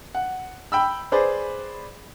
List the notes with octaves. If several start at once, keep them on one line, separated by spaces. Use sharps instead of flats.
F#5
G5 B5 E6
G#4 B4 C5 D5